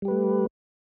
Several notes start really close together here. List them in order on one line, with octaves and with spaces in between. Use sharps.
G3 G4 B4 A3